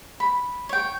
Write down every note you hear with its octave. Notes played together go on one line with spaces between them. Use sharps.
B5
C#5 G5